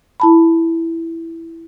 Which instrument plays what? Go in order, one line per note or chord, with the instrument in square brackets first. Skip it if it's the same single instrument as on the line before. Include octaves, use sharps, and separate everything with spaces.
[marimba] E4 A5 B5